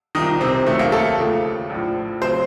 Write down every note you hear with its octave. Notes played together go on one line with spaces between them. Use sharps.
C2 A#2 D#3 F3 D#4
C3 C4
F1 D#2 D#3 F#3 A3
A#3
A3 A4
D#2 C#3 F3
A#1 A2 F3
C#3 F#3 C4 C5